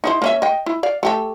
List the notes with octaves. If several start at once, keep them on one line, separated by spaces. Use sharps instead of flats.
D#4 E4 C5
A#3 C#4 E5
D#5 G5
E4
D5 F5
A3 G4 A4